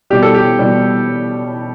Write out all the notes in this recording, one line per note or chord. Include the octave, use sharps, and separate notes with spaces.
B2 G3 G4
A4
G4
B2 G3